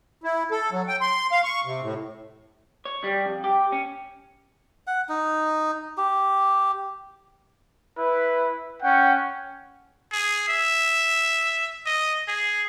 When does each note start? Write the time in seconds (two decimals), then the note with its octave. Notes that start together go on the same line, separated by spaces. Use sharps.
0.24 E4
0.51 A4
0.72 F#3
0.88 G5
1.01 C6
1.32 F5
1.44 C#6
1.65 C3
1.82 A2
2.85 C#5
3.04 G3
3.26 F2
3.44 G4
3.72 C#4
4.87 F#5
5.09 D#4
5.98 G4
7.97 E4 B4
8.82 C#4 F#5 G5
10.12 G#4
10.48 E5
11.86 D#5
12.28 G#4